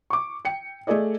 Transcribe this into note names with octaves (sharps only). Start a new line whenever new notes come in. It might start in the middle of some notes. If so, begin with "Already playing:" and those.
C#6 D6
G5 C#7
A3 G#4 A4 D5 D#5